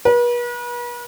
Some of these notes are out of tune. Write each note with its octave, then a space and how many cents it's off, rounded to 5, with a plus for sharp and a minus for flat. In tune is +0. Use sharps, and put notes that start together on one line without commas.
B4 -40